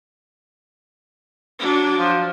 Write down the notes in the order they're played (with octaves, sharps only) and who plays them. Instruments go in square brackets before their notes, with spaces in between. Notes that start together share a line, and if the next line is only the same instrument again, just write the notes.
[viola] F#3 D4
[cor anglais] F3